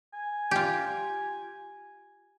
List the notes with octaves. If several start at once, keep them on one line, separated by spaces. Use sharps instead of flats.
G#5
F4 G4